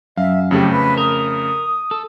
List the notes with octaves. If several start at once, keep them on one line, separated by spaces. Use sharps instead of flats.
F#2 E5 F5
F2 C#3 A3 G4
B4
A#4 D#6
A4